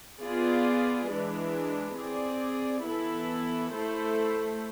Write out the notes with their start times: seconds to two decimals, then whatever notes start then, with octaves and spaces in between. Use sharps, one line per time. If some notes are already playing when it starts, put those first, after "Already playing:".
0.21 B3 F4 G#4 D5
1.08 E3 G#3 D4
1.97 C4 G#4 D5
2.85 E3 B3 E4 A4
3.73 A3 E4 A4 C5